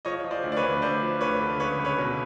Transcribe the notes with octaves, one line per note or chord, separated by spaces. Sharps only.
F3 C#5 D#5
F3
C5 D5
D2
D5
B4 C#5
D2
D2 C5 D5
F3
D2 B4 C#5
D3
C#2 B4 C#5
C#2
B4 C#5
B2